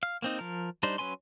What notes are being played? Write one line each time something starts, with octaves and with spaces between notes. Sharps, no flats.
F5
A#3 C4 D#4
F3 A#4
G3 D4 D#4 C5
F#3 C#4 B4 G#5 C6